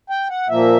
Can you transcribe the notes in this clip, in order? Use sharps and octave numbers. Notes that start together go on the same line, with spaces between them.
G5
F#5
A#2 F3 A#3 E5